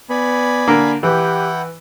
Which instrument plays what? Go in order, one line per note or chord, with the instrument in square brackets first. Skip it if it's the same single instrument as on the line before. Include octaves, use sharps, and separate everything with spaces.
[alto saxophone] B3 [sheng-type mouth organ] D5 G#5 B5
[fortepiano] D3 A#3
[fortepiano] E3 [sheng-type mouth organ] E4 F#5 G5 [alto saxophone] G4